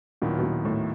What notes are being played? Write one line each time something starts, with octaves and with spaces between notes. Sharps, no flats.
D#2 A#2 D#3 F#3 B3 E4
B2
A#2
A2